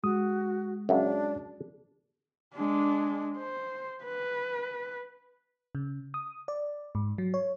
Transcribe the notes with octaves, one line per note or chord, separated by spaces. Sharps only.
G#3 F#4 D#6
F#2 C#3 D4
G#3 D4
C5
B4
C#3
D#6
D5
G#2
F#3
C#5